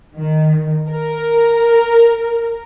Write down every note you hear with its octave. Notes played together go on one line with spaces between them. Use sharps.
D#3
A#4